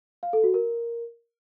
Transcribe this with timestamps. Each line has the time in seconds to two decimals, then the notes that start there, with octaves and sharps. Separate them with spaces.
0.23 F5
0.33 A4
0.44 F#4
0.54 A#4